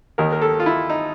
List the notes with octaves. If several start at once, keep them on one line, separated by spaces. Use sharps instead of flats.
D#2 D#3 A#4
A#4
A4
F4
E4
D#4